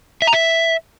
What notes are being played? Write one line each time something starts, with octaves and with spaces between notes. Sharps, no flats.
E5
A#5
E5